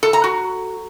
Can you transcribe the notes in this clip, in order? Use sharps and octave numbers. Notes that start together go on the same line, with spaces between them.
A4
A#5
F#4